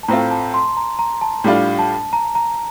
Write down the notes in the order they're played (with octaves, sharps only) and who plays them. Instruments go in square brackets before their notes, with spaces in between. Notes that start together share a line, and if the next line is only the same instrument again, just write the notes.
[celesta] A5
[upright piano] A2 A3 C4 F4 [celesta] A#5
[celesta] A5
C6
A#5
A#5
A5
[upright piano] A2 G3 D4 F4
[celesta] A5
A#5
A#5